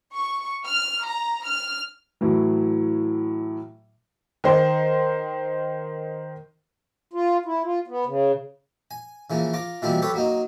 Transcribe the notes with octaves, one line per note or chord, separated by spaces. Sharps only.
C#6
F6
A#5
F6
A2 E3 F#3
D#3 C5
F4
E4
F4
B3
C#3
G#5
C#3 E3 F3 A#3
F4 A#5 D6
B2 E3 F3 G3 A#3 C4
G4 A4 B4 C#5
F#3 A#3 D#4